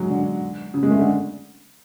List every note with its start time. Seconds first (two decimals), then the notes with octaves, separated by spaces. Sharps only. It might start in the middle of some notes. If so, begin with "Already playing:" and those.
Already playing: F#3 G#3
0.09 D3
0.74 C#3
0.83 G#3
0.91 A3
0.99 D3